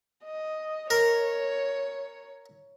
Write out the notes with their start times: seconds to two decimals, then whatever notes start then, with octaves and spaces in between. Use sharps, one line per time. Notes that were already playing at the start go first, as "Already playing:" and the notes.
0.25 D#5
0.90 A#4 C#5